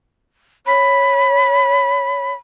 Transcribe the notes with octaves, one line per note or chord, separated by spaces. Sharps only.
C#5 B5